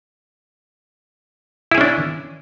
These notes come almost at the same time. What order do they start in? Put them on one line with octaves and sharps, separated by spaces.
E4 G#4 C#4 D4